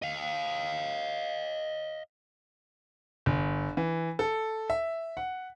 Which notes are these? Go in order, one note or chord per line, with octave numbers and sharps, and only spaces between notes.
D#5 F5
G1
E3
A4
E5
F#5